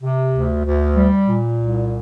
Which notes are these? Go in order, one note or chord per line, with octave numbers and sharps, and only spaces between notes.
C3
D2
D2
G3
A#2
C2